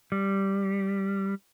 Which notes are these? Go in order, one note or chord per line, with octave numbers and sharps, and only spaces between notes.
G3